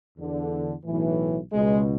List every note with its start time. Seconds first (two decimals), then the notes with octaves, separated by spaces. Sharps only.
0.18 E2 D3
0.85 B1 A2 E3
1.51 C#2 B2 G#3